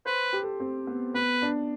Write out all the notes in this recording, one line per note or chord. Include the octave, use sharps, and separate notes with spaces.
B4 C5
G4
A4
C4
B3
B3 B4
D4